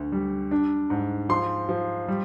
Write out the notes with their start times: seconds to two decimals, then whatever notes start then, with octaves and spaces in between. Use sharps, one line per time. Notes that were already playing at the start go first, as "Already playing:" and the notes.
Already playing: D2
0.12 G3
0.51 D4
0.90 G#2
1.29 F3 C6
1.69 F3
2.08 G3